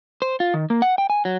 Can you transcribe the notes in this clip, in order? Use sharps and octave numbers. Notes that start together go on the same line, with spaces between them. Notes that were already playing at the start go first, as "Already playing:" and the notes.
C5
F4
D#3
A#3
F#5
G5
G#5
F#3